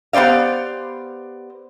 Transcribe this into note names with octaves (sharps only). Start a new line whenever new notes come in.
B3 G4 C5 D5 F5